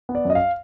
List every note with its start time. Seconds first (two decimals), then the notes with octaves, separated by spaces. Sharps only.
0.09 B3
0.15 D5
0.25 F#2 D#5
0.35 F5